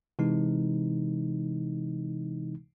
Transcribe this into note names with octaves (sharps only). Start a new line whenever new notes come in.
C3 E3 G#3 D#4